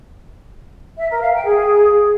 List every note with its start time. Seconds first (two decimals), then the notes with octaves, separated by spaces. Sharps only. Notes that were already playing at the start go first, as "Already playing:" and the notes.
0.98 E5
1.09 A#4
1.21 F5
1.33 G5
1.45 G#4